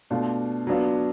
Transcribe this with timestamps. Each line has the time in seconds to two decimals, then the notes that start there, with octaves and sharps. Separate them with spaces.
0.10 B2 A3 D4 F4
0.67 F#3 B3 D4 F4